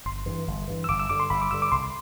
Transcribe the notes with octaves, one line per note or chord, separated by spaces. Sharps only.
G1 C6
G2 E3
G1
G2 E3
E6
G1 D6
E6
G2 D3 D6
C6
G1 B5
D6
G2 D3 E6
D6
C2 C6